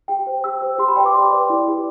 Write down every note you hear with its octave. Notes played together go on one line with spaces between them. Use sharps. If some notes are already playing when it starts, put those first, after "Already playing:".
G4 G5
C5
G4 E6
C5
G4 C6
B5
B4 D5 G5
D6
G4 C6
B4 D5
E4
G4 D5